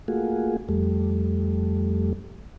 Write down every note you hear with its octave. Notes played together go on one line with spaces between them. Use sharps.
A3 A#3 F4 F#4 G#4
F2 G3 A3